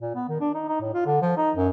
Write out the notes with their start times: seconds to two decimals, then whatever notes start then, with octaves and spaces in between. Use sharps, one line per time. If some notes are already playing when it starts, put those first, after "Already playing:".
0.01 A#2
0.15 B3
0.29 D#3
0.41 D4
0.55 D#4
0.68 D#4
0.81 A2
0.94 F4
1.06 D3
1.22 F3
1.37 D#4
1.56 F#2